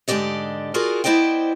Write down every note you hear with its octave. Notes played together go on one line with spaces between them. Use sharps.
G#2 D3 G4 D5 D#5
F4 F#4 G#4 A#4 D5
B3 E4 C5 D5 D#5 G5